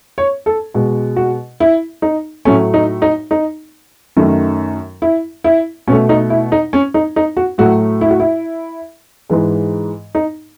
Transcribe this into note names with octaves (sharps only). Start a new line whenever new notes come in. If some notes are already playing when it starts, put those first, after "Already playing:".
C#5
A4
B2 G#3
F#4
E4
D#4
A2 F#3 A3 C#4
D#4
D#4
D#4
F#2 D#3 A3
E4
E4
B2 A3 C#4
D#4
E4
D#4
C#4
D#4
D#4
F#4
A2 F#3 A3 F#4
E4
F#4
E4
G#2 E3 G#3
D#4